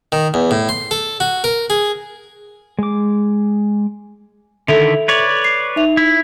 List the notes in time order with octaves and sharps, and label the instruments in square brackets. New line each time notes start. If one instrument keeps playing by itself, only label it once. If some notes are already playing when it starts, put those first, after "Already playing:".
[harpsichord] D#3
E2
A2
C6
A4
F#4
A#4
G#4
[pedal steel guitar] G#3 D6
[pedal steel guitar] D3 D#3 E4 [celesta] A4 E5 F7
[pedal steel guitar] B4 C#5 D5
[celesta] C7
D#4 E5 F7
[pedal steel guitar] E4